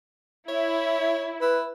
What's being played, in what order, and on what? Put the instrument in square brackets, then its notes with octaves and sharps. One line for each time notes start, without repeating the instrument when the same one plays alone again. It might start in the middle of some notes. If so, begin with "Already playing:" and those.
[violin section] E4 [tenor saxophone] C#5
[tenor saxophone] E4 [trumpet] B4